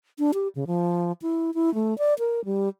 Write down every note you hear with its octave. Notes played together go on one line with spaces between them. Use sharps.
D4
G4
C#3
F3
E4
E4
A3
D5
A#4
G3